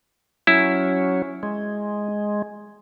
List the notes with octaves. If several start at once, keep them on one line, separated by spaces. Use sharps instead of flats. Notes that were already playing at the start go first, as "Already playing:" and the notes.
F#3 C#4 E4
G#3